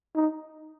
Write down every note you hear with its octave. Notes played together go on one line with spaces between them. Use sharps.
D#4